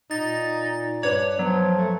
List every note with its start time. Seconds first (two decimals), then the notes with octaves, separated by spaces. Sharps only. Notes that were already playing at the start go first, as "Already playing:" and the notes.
0.11 A#2 D#4 A6
1.03 G2 B4 C#5 D5
1.39 F3 F#3 B3
1.78 A3